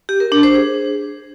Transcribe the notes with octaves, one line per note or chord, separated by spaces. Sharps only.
G4
A#4
D4
C5
G#4